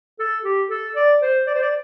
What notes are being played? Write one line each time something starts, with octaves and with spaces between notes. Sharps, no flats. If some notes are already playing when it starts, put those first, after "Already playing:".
A4
G4
A4
D5
C5
D5
C5
D5